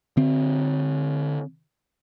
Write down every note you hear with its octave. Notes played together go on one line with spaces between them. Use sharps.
D3 C4